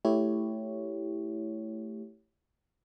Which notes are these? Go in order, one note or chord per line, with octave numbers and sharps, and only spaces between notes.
A3 E4 G4 C#5